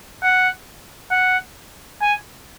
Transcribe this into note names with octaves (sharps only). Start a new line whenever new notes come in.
F#5
F#5
G#5